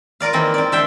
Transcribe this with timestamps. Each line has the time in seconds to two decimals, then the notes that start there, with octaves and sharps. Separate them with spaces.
0.20 F4 A#4 D5 F5
0.33 D#3 E3 A#3 C4
0.54 C4 D5
0.72 D3 A4 E5 G5